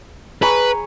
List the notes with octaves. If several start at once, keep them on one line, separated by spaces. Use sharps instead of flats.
G#4 B4 C#5 A#5 B5